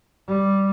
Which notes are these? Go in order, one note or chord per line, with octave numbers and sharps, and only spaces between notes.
G3